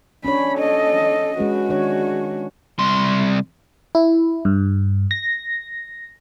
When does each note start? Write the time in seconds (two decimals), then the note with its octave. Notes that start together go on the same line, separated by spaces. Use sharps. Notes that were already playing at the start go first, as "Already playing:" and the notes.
0.25 C#4 D4 C#5 B5
0.57 A4 D#5
1.38 G#3 C#4 F#4 B4
1.69 D#3 D4 C#5
2.79 C2 C6
3.95 E4
4.45 G2
5.11 A#6